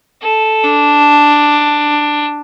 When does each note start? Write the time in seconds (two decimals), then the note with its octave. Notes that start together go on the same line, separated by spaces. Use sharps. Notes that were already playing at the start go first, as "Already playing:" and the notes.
0.22 A4
0.64 D4